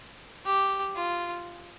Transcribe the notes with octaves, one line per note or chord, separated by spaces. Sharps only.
G4
F4